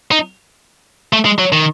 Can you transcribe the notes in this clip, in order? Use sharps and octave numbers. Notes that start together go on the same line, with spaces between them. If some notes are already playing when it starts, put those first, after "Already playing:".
D#4
A3
G#3
F#3
D#3